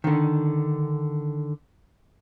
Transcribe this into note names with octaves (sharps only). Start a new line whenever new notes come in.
D3 D#3